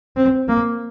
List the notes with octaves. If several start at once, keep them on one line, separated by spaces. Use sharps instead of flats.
C4
A#3